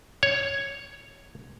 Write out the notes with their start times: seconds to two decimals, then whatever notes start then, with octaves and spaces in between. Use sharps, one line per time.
0.23 C#5